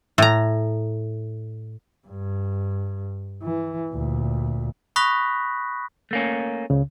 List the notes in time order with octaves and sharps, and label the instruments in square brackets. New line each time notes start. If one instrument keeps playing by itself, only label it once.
[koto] A2 A#5
[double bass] G2
E3
D2 A#2
[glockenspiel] B5 C#6 D#6 F#6 A#6 B6
[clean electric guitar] A3 A#3 C#4
[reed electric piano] C#2 C#3